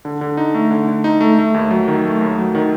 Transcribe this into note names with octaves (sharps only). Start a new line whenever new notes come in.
D3
D3
D#4
A3
D3
D3
D#4
A3
A3
D#2
F#3
D#3
A3
D#2
F#3
D#3